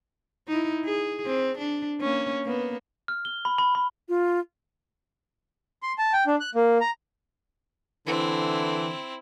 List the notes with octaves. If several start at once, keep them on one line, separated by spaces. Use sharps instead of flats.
D#4 E4
G#4
C4
D4
A#3 C#4
A#3 B3
F6
G7
B5
B5
B5
F4
C6
A5
G5
D4
F#6
A#3
A#5
D3 E3 C4 E4